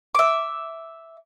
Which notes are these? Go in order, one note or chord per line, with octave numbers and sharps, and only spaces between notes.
E5 D6